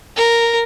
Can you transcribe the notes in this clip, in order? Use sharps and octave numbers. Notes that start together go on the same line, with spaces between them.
A#4